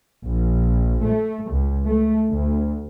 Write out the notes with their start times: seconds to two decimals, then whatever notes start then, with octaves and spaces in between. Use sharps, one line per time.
0.25 A#1
1.03 A3
1.51 C#2
1.86 A3
2.31 D2